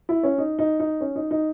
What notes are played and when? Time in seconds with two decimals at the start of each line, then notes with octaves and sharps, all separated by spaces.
0.09 E4
0.23 C#4
0.38 D#4
0.59 D#4
0.80 D#4
1.01 C#4
1.16 D#4
1.31 D#4